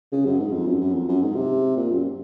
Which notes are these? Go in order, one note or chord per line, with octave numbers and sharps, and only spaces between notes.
C#3
F#2
G#2
F2
F#2
F#2
F2
F#2
G#2
C3
A#2
F#2